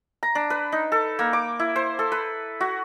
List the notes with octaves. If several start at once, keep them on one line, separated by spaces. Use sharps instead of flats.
A#5
D4
B4
D#4
A4
A#3
D6
E4
C5
A4
B4
F#4